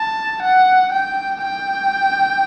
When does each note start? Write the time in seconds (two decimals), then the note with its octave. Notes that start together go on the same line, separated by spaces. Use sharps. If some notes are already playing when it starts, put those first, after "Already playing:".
Already playing: A5
0.42 F#5
0.93 G5
1.44 G5